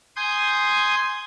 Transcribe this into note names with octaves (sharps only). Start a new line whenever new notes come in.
G#5 C6 D#6 G6